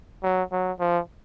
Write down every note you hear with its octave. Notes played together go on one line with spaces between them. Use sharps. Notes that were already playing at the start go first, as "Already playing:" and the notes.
F#3
F#3
F3